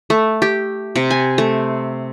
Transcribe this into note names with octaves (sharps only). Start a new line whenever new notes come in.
A3
G4
C3
G#5
A3